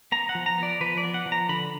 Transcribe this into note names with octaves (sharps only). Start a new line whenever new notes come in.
B3 A#5
F#5
F3
A#5
B3 D5
F3 B4
D5
B3
F#5
F3
A#5
D3 B5